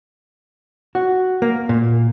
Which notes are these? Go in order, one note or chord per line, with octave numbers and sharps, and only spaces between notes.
F#4
A#3
A#2